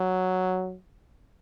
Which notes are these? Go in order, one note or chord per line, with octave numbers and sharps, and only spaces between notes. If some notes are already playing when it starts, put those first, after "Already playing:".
Already playing: F#3